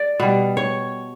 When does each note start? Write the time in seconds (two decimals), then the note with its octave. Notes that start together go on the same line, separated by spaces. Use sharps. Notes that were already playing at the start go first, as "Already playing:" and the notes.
Already playing: D5
0.20 B2 G3
0.57 C#5